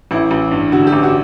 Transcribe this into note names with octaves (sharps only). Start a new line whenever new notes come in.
A1 E4
A1
G2
D3 F#4
G4
A1
F#4